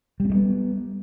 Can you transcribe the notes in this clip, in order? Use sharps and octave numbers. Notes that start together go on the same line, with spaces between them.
G3 G#3 B3 C4